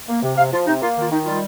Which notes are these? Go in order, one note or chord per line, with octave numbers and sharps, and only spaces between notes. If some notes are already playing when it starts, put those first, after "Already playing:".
A#3
C3
C3 F5
F3 F4
C3 D#4
A#3 F4
D#3 F4
D#3 D#4
G3 F4